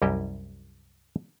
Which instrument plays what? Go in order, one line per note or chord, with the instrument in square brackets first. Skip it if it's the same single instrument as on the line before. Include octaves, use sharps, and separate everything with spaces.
[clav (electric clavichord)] C2 F#2 G3 E4 G4 D#5